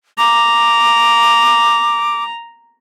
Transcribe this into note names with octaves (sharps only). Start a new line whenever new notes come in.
A#5 D6